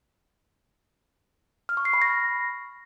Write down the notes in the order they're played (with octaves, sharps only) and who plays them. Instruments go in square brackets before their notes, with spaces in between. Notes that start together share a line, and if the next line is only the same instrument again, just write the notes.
[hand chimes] F6
C#6
C7
B5
A#6